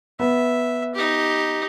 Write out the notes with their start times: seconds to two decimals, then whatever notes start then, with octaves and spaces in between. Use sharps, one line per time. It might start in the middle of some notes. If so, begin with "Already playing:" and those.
0.20 B3 B4 E5
0.95 D#4 G4